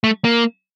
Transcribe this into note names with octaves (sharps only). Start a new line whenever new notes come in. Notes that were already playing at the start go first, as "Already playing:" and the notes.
A3
A#3